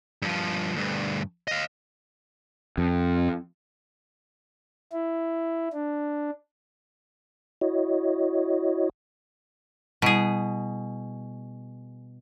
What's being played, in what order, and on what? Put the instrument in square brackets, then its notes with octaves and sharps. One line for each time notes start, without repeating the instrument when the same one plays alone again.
[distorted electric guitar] G2 F3
D2 G2
D#5 F5
[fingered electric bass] F2
[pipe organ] E4
D4
[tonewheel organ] E4 F#4 C#5 D#5
[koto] B2 G#4 [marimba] G3 E4 F#5